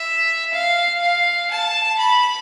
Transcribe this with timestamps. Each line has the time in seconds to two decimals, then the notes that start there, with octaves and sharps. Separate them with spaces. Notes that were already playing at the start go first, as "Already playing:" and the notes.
Already playing: E5
0.53 F5
1.02 F5
1.51 A5
1.98 B5